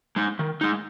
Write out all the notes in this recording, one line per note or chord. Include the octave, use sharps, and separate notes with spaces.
G#3 D#4
D#3
G#3 D#4